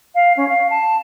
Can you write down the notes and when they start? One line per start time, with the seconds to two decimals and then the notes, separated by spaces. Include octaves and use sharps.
0.14 F5
0.37 C#4
0.48 F5
0.70 A5